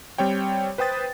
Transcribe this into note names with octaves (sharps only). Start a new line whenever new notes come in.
G3 C4 C#5 G5
B4 C5 G5 D#6 A6